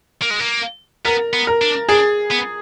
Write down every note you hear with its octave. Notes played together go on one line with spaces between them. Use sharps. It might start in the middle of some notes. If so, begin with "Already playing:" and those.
A#3
G#3
A#3
B3 A#4
B3
A#4
D4
D4 G#4
B3